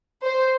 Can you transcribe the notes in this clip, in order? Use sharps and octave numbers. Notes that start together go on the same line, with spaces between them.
C5